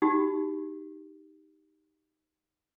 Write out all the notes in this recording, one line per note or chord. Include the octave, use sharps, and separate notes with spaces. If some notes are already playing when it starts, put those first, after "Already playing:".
D#4 F#4 G4